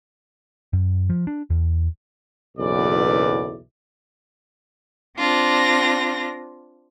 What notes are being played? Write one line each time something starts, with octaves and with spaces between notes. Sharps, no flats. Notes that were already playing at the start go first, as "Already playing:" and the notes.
F#2
F3
D4
E2
F#1 B1 E2 E3 D5
C4 D4 F4 A#6